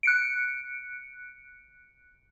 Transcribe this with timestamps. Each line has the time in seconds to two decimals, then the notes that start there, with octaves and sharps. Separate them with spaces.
0.03 F#6 C#7 D7